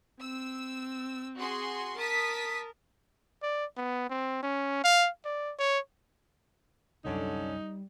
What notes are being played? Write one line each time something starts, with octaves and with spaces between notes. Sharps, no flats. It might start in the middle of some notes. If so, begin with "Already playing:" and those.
C4 E6
F#4 G#4 C6
A#4 A5 D#6 B6
D5
B3
C4
C#4
F5
D5
C#5
C2 F#2 D3 G3 C#4 D#4